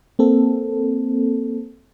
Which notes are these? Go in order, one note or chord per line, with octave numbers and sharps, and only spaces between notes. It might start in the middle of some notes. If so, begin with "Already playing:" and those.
A#3 C4 A4